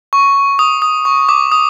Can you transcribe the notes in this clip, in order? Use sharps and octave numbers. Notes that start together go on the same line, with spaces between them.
C#6
D#6
D#6
C#6
D6
D#6